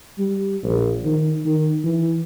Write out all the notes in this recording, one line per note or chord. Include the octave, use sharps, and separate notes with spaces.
G3
A#1
D#3
D#3
E3